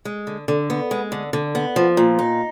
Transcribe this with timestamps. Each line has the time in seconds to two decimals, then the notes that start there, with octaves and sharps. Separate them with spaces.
0.05 G#3
0.27 D3
0.48 D3
0.70 B3
0.91 G#3
1.12 D3
1.33 D3
1.55 B3
1.76 F3
1.97 A#2
2.19 D#4